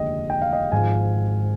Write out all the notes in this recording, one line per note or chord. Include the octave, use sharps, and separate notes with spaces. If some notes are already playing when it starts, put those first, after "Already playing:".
Already playing: F1 D#2 D3 G#3 D#5 G5
G5
F5
D#5 G5
G#1 G#2 F3 G#3 F5 G#5